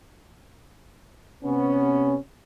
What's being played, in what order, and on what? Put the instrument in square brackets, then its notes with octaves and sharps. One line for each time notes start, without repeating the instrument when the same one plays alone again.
[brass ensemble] C3 B3 C#4